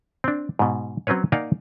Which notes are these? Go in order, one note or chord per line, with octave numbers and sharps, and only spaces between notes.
C4 D4
G#2 B2
F#3 C4 C#4 B4 C#5
A#3 D#4 D5 F5 F#5 G#5